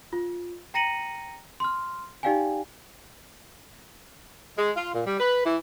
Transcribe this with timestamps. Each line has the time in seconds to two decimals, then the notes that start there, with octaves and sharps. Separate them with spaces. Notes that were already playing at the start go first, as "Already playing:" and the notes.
0.13 F4
0.74 G5 A#5 A#6 C#7 D#7 F#7
1.60 C6 F6
2.23 D#4 G4 D5 F5 G5 G#5
4.58 G#3
4.76 F4
4.95 A#2
5.06 G3
5.20 B4
5.46 E3